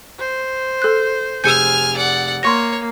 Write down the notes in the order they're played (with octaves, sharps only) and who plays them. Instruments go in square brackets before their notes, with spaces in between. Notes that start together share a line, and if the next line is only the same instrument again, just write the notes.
[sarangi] C5
[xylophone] A4 F#6
[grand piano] F1 G#4 E6 [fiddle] G#5 F6 [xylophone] G6 C#7 D#7
[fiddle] D5 F#5
[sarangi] A#3 [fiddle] C#5 [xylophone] C6 C#6 A#6